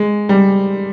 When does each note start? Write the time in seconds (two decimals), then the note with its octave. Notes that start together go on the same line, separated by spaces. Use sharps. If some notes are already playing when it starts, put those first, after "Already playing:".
Already playing: G#3
0.29 G3